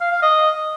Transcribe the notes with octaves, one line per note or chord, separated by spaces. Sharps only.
F5
F5
D#5